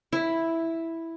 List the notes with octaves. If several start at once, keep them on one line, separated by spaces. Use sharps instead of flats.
E4